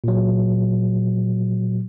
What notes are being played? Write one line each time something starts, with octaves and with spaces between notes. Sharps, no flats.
A#2 F#3